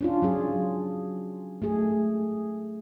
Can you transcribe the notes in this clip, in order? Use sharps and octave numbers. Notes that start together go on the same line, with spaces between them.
C#4 D4 F4
F#3 C#4 G#4
A3 G#4